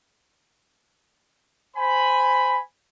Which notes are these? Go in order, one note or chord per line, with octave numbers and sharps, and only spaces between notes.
C5 G#5 B5